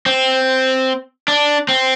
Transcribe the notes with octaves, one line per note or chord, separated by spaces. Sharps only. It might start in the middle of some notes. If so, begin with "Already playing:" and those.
C4
D4
C4